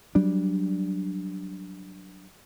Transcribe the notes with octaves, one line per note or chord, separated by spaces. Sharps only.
F#3 G3 D4